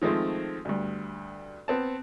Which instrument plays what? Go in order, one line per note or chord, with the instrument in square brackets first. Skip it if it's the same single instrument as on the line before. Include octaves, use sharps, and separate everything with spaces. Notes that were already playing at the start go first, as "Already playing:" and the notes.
[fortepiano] D#3 F3 G#3 A3 C4
D2 G2
B3 C4 A5